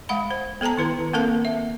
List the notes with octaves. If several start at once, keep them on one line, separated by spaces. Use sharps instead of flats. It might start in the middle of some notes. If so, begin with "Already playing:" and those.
G#3 F5 F#5 B5
C5
B3 A4 G5 A5 A#5
D#3 E4 B4
A#3 C4 A4 A#4 F5 A5
E5